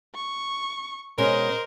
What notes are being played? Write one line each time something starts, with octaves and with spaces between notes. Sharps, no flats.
C#6
B2 G#3 C#4 A#4 C5 D#5